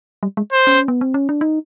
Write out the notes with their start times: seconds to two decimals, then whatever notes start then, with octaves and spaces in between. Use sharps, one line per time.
0.23 G3
0.37 G#3
0.53 C5
0.67 C#4
0.88 B3
1.01 C4
1.14 C#4
1.29 D4
1.41 D#4